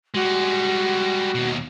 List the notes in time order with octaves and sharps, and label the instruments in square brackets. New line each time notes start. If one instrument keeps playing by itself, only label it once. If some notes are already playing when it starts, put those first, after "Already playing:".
[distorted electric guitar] G3 G#3 [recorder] F#4
[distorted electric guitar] D#2 B2